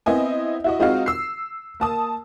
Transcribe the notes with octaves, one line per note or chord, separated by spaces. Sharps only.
B3 C4 E4 D#5 G#5
E4 F#4 D#5
G#3 C4 D#4 F4 F#4 F5
E6 C7
A#3 A5 D#6